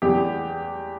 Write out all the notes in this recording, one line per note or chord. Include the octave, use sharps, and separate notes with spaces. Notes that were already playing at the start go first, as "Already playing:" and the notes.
E2 G4